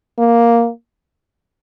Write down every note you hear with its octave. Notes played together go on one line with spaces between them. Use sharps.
A#3